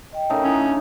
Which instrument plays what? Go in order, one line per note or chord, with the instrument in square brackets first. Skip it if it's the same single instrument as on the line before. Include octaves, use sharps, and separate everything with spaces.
[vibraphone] D#5 G5
[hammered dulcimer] C#3 A3 D#4 [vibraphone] A#4 G5
[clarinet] C#4 [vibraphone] E4 A#5 D#6
[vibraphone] D4